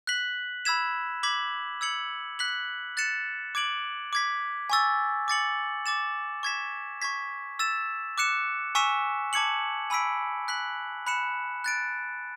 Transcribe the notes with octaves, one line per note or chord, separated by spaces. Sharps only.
F#6 B6 F#7
B5 E6 G#6 B6 E7
D6 G#6 B6 F#7
E6 G#6 C#7 F#7
F#6 B6 F#7
F#6 A6 C#7 E7
D6 G#6 D7 F#7
D6 G#6 B6
G#5 C#6 E6 A6
D6 A6 C#7 F#7
D6 A6 E7
C#6 G#6 B6 E7
C#6 G#6 B6
E6 A6 E7
D6 F#6 C#7 E7
G#5 C#6 E6 B6 E7
A5 D6 G#6 C#7 F#7
G#5 B5 E6 B6 D7
F#6 B6 F#7
B5 F#6 C#7 E7
F#6 A6 D7